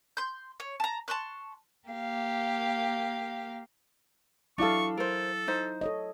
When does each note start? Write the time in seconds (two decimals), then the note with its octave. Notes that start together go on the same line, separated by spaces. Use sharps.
0.17 C6 G6
0.60 C#5
0.80 A5 A#5
1.08 A5 C6 C#6 F#6
1.88 A#3 G4 F5
4.58 F#3 D4 E4 A4 F5 C#6
4.97 A4 A#4 C5
5.48 D#4 C5
5.81 A4 C#5 D#5